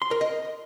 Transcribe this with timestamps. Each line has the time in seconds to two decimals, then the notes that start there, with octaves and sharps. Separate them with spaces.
0.02 C6
0.11 A#4
0.21 D#5